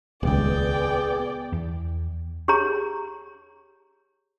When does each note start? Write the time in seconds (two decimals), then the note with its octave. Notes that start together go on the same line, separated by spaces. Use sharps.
0.23 D#1 C#2 B3 G#4 D5 G5
1.52 E2
2.48 G4 G#4 C#5 A#5